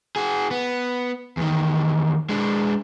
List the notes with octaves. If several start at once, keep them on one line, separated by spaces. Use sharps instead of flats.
F#4 G#4
B3
E2 D#3
G#3 D4